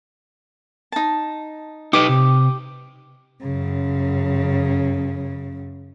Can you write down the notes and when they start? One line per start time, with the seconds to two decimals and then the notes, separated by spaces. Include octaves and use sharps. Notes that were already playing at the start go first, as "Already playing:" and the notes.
0.92 D#4 A5
1.93 D#4 G4 B4 D#5 D6 D#6
2.09 C3
3.42 F#2 C#3